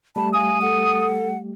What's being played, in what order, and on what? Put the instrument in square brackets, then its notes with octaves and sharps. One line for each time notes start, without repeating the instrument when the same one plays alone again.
[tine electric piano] G3 A3 G4 [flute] A5 [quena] B5
[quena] F5 [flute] G#5 [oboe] D#6
[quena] A4 [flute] F#5